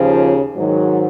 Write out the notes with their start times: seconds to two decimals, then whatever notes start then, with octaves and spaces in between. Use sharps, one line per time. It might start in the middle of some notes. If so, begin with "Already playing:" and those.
Already playing: D#2 C#3 F3
0.55 G#2 D#3 F#3